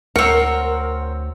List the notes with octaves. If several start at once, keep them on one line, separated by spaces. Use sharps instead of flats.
D2 C4 A#4 C#5 F#5